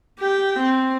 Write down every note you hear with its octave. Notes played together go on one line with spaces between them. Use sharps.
G4 G5
C4